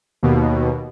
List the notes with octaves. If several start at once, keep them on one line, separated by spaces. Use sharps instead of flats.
D#2 B2